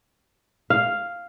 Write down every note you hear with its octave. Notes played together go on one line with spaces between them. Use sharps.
F5